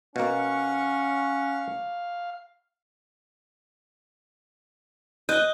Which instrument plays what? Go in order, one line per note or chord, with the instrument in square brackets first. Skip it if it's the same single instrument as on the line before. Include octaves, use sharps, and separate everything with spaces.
[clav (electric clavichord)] B2 A#3 [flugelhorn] C#4 [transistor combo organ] F5 [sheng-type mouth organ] F#5 C#6
[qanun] D#5 [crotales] F#6 G6